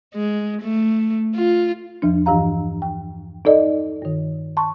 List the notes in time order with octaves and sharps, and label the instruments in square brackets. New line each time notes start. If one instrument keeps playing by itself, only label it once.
[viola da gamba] G#3
A3
F4
[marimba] E2 F3 D4
G2 E3 G4 F5 A#5
G5
D#4 A4 D5 D#5
G2 D#3
A5 C6 C#6